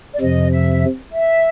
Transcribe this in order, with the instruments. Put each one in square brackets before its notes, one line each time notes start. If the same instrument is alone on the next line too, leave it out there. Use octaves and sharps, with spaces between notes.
[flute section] D5
[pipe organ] F2 C3 F3 [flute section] D#5
[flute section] E5
E5